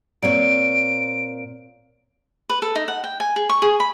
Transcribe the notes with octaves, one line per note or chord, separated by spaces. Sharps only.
A#2 C4 C#5 D7
B4
A4
D#4
F#5
G5
G#5
G#4
C#6
G#4
B5